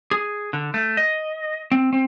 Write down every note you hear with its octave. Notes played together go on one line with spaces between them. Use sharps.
G#4
D3
A3
D#5
C4
C4